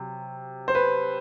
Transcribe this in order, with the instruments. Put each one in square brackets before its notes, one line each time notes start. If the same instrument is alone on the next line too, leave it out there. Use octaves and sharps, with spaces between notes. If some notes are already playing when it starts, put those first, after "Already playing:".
Already playing: [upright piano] C3 F#3
C5
B4